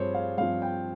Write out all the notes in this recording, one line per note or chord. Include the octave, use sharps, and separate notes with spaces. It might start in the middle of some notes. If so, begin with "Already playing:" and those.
Already playing: G2 F3 C4 G#4 C5 C#5
F5
G2 F3 C4 F5
G5